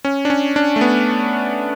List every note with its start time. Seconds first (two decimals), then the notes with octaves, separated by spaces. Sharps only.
0.05 C#4
0.25 D4
0.30 C#4
0.56 D4
0.76 A3
0.81 B3